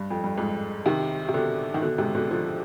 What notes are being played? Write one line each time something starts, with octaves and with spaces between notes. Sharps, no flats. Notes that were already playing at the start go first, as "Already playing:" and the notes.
Already playing: G2
F2
G2
F2 G#2
C3 D#3
C3
B2 D3
D#3
B2 D3
G#2 C3
B2 D3
D3 F3